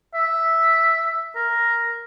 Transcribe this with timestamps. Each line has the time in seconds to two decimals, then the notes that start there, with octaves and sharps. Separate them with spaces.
0.14 E5
1.36 A#4